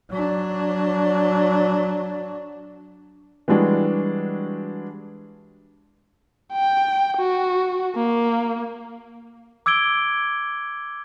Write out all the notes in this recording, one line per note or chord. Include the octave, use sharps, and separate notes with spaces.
F#3 D4
E3 G3 G#3 D4 F#4
G5
F#4
A#3
D6 E6 G#6 D7 G7